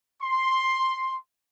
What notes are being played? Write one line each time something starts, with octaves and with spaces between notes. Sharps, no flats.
C6